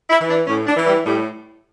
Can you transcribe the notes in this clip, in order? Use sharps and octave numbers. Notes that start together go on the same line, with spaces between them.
E4
E3
D4
A2 C#4
D4
E3
G3
A2 G3